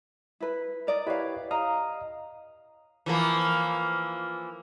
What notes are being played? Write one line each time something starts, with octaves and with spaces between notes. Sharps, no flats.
E4 B4
A#4 D5 D#5
E4 G4 B4 C#5 F5
D#5 F5 A#5 D#6
E3 F3 A#3